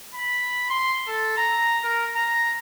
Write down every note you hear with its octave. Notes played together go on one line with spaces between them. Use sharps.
B5
C6
A4
A#5
A#4
A#5